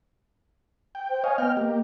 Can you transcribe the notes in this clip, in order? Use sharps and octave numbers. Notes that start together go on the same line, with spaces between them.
G5
C5
C#5 D#5 F5 G#5
B3 D#5 G5 F6
A#3 G4